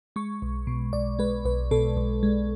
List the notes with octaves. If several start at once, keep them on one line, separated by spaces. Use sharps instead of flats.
G#3 C#6
B1
B2
B1 D5
G#3 B4
B1 B4
B2 A4
B1
G#3